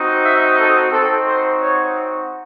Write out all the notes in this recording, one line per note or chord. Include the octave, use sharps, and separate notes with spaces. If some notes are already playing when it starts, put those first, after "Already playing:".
Already playing: C4 D#4 F#4
E5
A4
C4 D#4 F#4 A4
C5
C#5